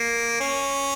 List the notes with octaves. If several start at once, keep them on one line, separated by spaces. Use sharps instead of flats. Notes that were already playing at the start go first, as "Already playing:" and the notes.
Already playing: A#3
C#4